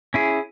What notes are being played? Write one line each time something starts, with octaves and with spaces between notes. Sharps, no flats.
C#4 E4 G#4